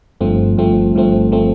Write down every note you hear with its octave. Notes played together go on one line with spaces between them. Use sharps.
G1 G2 F3 A3 C4
G1 G2 F3 A3 C4
G1 G2 F3 A3 C4
F3 A3 C4